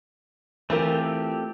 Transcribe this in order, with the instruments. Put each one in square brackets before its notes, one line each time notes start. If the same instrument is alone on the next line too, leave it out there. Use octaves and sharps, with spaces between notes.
[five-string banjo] E3 F4 A#4 [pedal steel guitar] A3 C4 G4